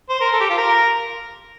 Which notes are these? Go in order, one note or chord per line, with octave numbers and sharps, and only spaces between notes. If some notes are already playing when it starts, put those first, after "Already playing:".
C5
A#4
A4
G4
F4
A#4